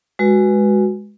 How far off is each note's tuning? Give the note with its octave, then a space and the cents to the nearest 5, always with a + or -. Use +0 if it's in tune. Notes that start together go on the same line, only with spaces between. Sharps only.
G#3 +0 F#4 +0 B4 -10